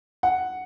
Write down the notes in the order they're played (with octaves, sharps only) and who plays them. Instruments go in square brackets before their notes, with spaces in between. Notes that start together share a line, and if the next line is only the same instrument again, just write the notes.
[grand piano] F#5